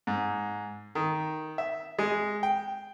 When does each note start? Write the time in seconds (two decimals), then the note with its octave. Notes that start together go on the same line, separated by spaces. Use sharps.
0.07 G#2
0.95 D#3
1.58 E5
1.99 G#3
2.43 G5